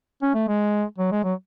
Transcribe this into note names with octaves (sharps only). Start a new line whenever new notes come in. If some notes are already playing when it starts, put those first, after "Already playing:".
C#4
A3
G#3
F#3
G#3
F#3